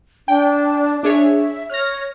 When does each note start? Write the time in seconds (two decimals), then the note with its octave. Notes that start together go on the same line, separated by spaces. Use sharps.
0.28 D4 G5
1.03 D4 G#4 C#5 E5
1.70 C#5 F6 A#6